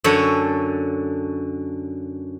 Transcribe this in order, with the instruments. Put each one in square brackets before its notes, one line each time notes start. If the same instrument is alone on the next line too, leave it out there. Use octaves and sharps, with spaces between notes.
[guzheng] F#2 D3 A4 C#5